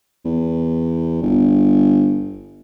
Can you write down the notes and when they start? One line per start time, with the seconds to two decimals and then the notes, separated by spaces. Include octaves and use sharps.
0.25 E2
1.22 G1